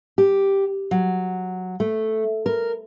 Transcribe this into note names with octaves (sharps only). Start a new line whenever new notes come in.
G4
F#3
A3
A#4